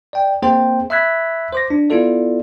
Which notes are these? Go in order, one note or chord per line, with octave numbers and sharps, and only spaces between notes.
D5 G5
A#3 C4 G#4 C5 G5
E5 B5 E6 F#6 G#6 B6
C5 D6 A#6
D4
B3 E4 F4 A4 D5